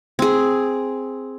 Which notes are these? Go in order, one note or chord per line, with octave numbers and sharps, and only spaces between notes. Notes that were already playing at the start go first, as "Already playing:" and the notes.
C4 G#4